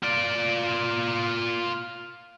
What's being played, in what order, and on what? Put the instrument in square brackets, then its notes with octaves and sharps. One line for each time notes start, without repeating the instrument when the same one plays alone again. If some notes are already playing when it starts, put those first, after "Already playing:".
[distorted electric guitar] F4 D5